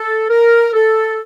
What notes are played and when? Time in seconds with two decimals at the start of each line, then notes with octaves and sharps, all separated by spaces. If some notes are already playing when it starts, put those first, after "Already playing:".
Already playing: A4
0.29 A#4
0.74 A4